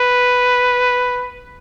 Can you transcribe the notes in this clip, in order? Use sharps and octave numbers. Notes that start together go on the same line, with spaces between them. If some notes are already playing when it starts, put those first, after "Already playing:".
Already playing: B4